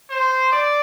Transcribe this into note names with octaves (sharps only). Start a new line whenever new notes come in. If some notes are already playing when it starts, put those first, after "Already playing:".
C5
D5